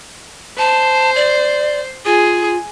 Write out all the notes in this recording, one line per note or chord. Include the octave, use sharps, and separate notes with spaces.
C5 A5
D5
F4 G#4